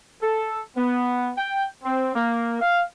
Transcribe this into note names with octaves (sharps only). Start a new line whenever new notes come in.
A4
B3
G5
C4
A#3
F5